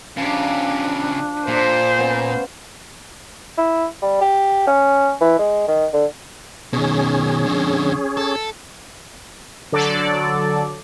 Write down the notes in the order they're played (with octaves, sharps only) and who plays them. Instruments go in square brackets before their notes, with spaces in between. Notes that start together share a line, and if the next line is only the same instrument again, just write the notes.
[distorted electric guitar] C#3 G4 [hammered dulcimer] F3 [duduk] D4
[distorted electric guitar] A#2 [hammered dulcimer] A4 D5 F5 [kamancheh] C5
[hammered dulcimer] B3 C#4 F5
[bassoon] E4
G3
G4
C#4
E3
G#3
D#3
D3
[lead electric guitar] B2 D#3 [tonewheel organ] C#4 G#4
[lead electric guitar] F2 D3
A4
[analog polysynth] D3 F#3 A4 D5